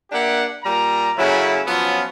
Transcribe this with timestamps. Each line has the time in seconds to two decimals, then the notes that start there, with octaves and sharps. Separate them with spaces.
0.12 A#3 D4 G4 E5 F#5
0.64 A#2 G3 A#5
1.18 C#3 F#3 A3 C#4 E4
1.67 F3 F#3 B3 C#4 F4